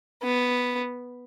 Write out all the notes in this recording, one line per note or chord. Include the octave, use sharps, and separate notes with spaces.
B3